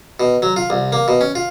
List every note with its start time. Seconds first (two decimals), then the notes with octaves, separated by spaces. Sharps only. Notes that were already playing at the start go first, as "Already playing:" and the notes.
0.20 B2
0.42 F#3
0.56 F4
0.70 C2
0.92 A#3
1.08 B2
1.21 C#4
1.35 F4